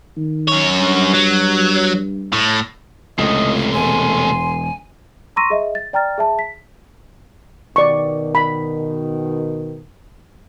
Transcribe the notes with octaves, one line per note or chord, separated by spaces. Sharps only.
D#3
F#2 C#5
G2
F#3
A2
C#2 A2 C3 A3 D#5
E1 G#5 C6
A#5 C6 C#6 E6 A#6 D#7
G#4 D#5 E5
A6
D5 G5 A#5 F6 A6
G#4 E5 A5
B6
B2 D#3 D5 C#6
B5